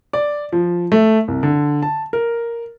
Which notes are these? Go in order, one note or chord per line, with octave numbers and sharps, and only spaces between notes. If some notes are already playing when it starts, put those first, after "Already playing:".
D5
F3
A3
C2
D3
A5
A#4